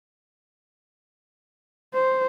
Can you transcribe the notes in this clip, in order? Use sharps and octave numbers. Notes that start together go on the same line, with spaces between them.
C5